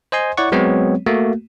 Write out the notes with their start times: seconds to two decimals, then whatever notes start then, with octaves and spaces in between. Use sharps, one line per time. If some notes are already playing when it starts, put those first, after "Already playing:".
0.12 C5 D#5 G#5 C6
0.37 E4 C#5 D5 F#5 C#6
0.52 F#3 G#3 B3 C4 C#5
1.06 A3 A#3 F#4